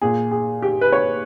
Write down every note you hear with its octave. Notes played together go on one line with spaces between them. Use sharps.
A#2 G#4
G#4
G4
B4
C#5